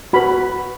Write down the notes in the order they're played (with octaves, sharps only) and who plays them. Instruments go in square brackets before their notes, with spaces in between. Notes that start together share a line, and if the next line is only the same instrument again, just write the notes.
[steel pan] F#4 B4 B5